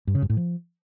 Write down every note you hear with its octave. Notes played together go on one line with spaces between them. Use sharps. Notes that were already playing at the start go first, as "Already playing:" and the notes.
G2
C#3
G2
A2
F3